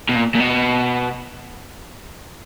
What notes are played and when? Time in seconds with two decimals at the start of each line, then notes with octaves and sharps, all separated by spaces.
0.09 B2
0.16 A#2
0.35 A#2
0.40 B2